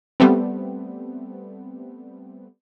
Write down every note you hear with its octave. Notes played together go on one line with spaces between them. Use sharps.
G3 A3 B3 C4